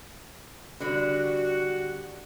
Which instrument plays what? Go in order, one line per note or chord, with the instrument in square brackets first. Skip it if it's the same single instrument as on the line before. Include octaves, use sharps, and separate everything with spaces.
[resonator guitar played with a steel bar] D3 [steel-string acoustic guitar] G3 D5 [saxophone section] F#4